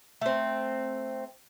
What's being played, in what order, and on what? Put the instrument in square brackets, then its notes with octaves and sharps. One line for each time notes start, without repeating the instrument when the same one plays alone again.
[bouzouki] A3 C4